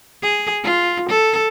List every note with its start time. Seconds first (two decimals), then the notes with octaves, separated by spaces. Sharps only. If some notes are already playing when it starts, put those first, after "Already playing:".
0.23 G#4
0.64 F4
1.09 A4